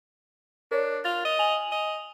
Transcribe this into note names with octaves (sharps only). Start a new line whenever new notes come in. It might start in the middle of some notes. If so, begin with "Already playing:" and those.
D4 A#4 C#5
F4 A6 F7
D#5
G#5 F7 F#7
D#5